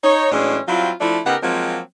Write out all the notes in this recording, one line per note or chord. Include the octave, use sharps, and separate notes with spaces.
D#4 C#5
A2 E3 F#3 G#3 C#4 D4
F#3 G3 C4 E4 F4
F3 A3 D4 E4
C#3 B3 D#4 G4 A#4 F#5
F3 F#3 G#3 A#3 C4